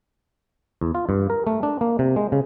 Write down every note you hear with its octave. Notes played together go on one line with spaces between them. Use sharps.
E2
F4
G2
A#4
A3
D4
A#3
C3
G#3
C#3